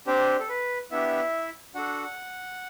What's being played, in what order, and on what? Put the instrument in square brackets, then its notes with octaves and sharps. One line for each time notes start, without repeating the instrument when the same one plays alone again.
[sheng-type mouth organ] C4 D4 G4 C5
A4
B4
B3 D4 E4 G4 E5
D4 F#4 A4 F#5